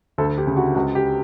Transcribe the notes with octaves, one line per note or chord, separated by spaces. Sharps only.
D2 A4
G4
C#3
F#4
C#2 F#4
G4